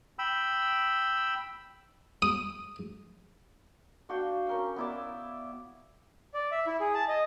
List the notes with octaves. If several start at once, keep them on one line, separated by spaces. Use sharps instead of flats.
G5 B5 E6
D#6
D4 F#4 F5 G5
C#4 A#4 G5
B3 E4 D5
D5
E5
E4
G#4
A5
D#5